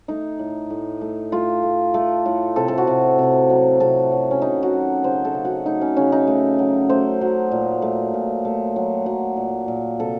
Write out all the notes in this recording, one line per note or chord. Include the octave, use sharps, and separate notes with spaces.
A3 D#4
A2
A2
A3
A3 F4
A3
A3
A2
C3 A4
A4
F#4
C3
C3
F#3
C3 A4
F#3
C#4
D#3 D#4
F#4
F#3
C#3 C5
A4
C#3
F#4
A3 D#4
C#4
C#3 C#4
D#4
A3
F#3
A3 C5
F#3
A#2
A3
A#2
A3
F#3
F#3
A#2
A#2
C3 A4